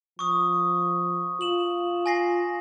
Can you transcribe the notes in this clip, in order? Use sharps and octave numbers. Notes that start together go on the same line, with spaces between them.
F3 C#6 D#6
F4 E7 F#7
G#5 A#6 C7